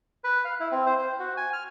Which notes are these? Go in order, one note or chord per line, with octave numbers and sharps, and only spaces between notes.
B4
F5
E4
C4
C5
C5
F#4
G#5
F6